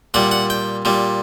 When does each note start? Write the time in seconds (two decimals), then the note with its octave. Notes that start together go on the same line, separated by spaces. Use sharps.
0.14 A#2 G3 F#5
0.31 F#5
0.50 G5
0.85 A#2 G3